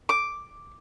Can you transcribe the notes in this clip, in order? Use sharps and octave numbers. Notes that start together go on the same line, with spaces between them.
D6